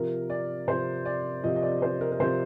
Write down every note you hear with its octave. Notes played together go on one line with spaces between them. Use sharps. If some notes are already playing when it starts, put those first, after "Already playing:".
Already playing: C3 F3 A#4
D5
C3 F3 C5
D5
C3 F3 D#5
D#5
D5
C5
A#4
A#4
C3 F3 C5